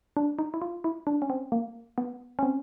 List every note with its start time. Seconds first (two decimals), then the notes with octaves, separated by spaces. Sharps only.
0.17 D4
0.39 D#4
0.54 E4
0.62 F4
0.84 E4
1.07 D4
1.22 C#4
1.30 C4
1.52 A#3
1.98 B3
2.39 C#4
2.43 C4